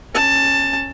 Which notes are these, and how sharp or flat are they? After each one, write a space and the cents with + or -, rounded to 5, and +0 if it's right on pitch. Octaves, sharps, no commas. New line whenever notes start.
C#4 -15 A5 +15